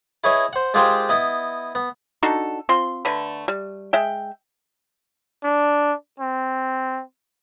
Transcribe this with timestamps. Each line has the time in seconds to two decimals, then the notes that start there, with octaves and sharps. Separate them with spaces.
0.24 E4 G#4 B4 C#5 D#5 E5
0.53 C5 F#5
0.74 G#3 F4 G4 G#4 A#4 C5
1.09 B3 E4 D#5
1.75 B3
2.23 D4 D#4 F#4 A4
2.69 C4 F4 C6
3.05 D3 A3 B4
3.48 G3
3.93 G#3 E5 G5
5.44 D4
6.20 C4